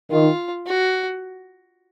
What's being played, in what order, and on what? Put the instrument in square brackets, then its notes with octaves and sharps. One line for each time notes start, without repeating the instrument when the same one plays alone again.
[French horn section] D#3 [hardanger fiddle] F4
[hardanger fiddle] F#4